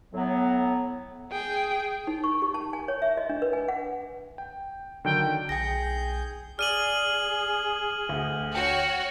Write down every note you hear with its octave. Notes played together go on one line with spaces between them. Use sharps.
A2 F#3 B3
G#4 G5
D#4
C#6
G4
A5
G#5
C#5
E5
D#5
D4
B4
G#5
F#5
G5
D3 D#3 F#3 G5
B1 G#4 G5 G6 A#6
G#4 D5 F6 D#7 F#7
D2
F#4 C#5 G5